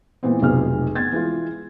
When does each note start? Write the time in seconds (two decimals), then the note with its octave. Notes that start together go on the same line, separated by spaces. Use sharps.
0.23 A#2 E3 G#3 B3 C4
0.42 F1 B1 C3 F3 G#4 F6
0.95 B3 G#6 A6
1.12 E3 G#3 F4